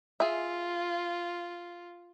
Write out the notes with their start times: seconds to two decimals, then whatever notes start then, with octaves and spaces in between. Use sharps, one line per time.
0.20 F4 G#4 E5